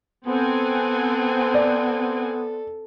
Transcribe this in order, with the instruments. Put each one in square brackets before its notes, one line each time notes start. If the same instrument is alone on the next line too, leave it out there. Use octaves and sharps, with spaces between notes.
[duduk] B3 [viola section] C4 F#5 G#5 [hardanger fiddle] A4
[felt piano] D5